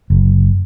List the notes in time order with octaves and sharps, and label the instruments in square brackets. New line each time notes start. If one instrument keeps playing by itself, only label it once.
[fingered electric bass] F#1